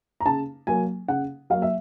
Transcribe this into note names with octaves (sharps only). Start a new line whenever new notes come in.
A#5
C#3 A5
F#3 A#3 G#5
C#3 F#5
F#3 A#3 F5
E5